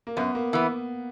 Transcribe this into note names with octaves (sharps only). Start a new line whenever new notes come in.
A#3
F#2 B3
A#3
E3 B3